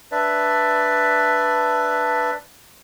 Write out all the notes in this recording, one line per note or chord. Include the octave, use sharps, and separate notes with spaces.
D4 B4 D5 E5